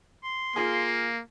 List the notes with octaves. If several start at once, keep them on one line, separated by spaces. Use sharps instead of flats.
C6
A#3 F4 G#4